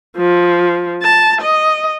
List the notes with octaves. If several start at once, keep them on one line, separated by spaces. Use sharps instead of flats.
F3
A5
D#5